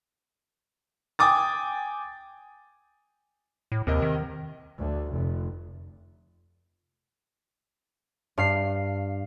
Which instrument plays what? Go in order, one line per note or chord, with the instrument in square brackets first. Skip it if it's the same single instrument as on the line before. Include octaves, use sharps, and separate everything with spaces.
[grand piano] G5 G#5 D6 D#6 A6
[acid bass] A2
[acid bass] D#2 [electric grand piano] C3 A#4 D#5
[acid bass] D#3
[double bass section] D2
F1
[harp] G2 F5 C7